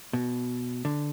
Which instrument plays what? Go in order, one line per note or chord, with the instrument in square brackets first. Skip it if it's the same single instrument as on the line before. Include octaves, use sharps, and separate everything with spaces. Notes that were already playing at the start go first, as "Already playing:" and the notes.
[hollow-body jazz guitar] B2
D3